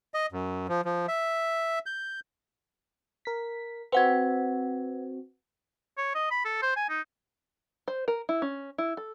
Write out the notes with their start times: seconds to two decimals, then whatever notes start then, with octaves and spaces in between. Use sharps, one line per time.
0.14 D#5
0.32 F#2
0.69 F3
0.85 F3
1.08 E5
1.86 G6
3.25 A#4 B6
3.92 C4 F#4 B4 F#5 G#6
5.98 C#5
6.15 D#5
6.31 B5
6.45 A4
6.62 C5
6.76 G#5
6.89 D#4
7.88 C5
8.08 A#4
8.29 E4
8.42 C#4
8.78 E4
8.97 A4